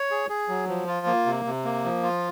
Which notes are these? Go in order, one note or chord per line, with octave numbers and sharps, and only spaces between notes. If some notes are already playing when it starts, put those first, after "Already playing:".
Already playing: C#5
G#4
G#4
F#3
F3
F4
A#3
C3
C3
A#3
F3
F4